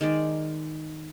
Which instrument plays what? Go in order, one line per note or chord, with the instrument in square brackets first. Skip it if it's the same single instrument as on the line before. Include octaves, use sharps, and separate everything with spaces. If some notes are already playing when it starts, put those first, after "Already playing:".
[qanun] D#3 G#3 D5